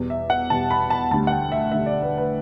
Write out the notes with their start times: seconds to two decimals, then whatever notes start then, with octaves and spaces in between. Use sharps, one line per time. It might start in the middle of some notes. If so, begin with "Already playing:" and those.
Already playing: E2 B2 G3
0.10 E5
0.30 F#5
0.50 E2 B2 G3 A5
0.71 B5
0.90 A5
1.11 D2 D3 G3 A5
1.27 F#5
1.32 G5
1.52 E5
1.71 D2 D3 G3 E5
1.86 D5
2.02 B4
2.18 B4